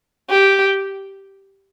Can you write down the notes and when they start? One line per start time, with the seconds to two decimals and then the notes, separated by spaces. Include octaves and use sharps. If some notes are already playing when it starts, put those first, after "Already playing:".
0.30 G4